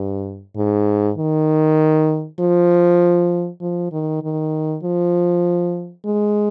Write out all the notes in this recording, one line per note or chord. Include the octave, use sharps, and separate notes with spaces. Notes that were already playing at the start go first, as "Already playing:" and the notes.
Already playing: G2
G#2
D#3
F3
F3
D#3
D#3
F3
G#3